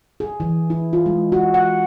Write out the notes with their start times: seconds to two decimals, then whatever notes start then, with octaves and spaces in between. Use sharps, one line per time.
0.20 G#4
0.40 E3
0.70 E4
0.93 F4
1.06 G#3
1.32 F#4
1.54 F#5